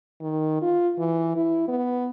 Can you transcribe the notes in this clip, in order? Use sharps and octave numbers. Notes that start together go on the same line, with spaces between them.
D#3
F4
E3
E4
B3